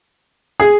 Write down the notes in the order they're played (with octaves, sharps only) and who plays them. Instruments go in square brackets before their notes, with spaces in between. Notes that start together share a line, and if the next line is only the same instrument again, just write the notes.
[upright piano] G#4